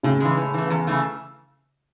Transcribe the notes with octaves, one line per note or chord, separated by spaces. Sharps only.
A2 C#3
E3 G#3
A2
E3 A3
E2
C#3 E3 A3